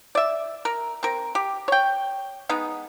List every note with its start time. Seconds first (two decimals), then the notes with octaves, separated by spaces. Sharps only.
0.15 D5 E5
0.65 A#4
1.03 C4 A#4
1.35 G4
1.68 C#5 G5
2.49 G#3 B3 D#4